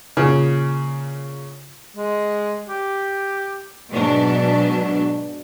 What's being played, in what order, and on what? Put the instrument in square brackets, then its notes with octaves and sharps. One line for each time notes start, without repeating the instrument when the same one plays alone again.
[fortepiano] A#2 C#3
[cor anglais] G#3
G4
[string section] G#2 B2 F#3 D4